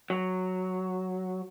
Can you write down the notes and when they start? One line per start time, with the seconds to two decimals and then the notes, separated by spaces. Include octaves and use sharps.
0.10 F#3